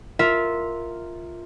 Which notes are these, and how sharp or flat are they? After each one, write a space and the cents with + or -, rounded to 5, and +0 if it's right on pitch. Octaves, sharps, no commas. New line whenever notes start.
F4 +0 A#4 -5 E5 -15